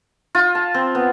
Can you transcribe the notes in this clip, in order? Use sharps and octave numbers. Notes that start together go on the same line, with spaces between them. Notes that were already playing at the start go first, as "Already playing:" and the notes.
F4
A5
C4
B3